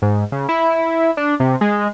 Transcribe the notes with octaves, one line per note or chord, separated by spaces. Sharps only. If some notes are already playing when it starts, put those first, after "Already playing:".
G#2
C#3
E4
D4
C3
G#3